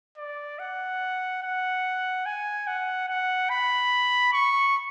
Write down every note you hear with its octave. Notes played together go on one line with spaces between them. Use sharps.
D5
F#5
F#5
G#5
F#5
F#5
B5
C#6